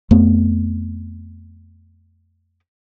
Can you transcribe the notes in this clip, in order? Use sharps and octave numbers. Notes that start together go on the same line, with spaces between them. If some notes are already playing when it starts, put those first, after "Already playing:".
F2 A3 B3